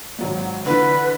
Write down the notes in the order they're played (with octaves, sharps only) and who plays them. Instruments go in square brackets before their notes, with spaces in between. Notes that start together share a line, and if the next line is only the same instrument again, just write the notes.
[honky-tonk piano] G#1 F#3 G#3
[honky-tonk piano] D3 E3 [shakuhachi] B4